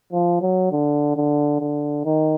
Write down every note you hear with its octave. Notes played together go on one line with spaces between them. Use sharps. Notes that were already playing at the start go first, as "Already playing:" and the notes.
F3
F#3
D3
D3
D3
D#3